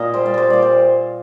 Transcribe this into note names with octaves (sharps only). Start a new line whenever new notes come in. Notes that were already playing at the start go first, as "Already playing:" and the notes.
Already playing: A#2 A#4 D#5
G3 C5
D5
G3 C5
A#2 D5
C5